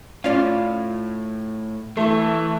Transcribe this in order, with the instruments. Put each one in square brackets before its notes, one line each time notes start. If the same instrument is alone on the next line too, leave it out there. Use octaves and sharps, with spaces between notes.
[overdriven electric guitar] A2 [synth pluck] C#4 D5 [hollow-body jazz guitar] F4 F5
[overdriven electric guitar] E3 [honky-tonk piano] A3